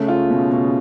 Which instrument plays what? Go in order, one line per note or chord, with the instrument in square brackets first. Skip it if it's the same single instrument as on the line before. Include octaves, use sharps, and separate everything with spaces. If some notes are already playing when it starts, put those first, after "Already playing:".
Already playing: [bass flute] C#3 [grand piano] A3
[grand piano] F4
B2
B2